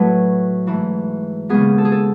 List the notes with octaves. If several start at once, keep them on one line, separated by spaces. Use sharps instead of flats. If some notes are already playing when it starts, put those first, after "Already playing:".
Already playing: A2 F#3 A3 B4 C#5
G#2 E3 A3
D#2 C#3 G#3 B3 G#4
A4
G#4
A4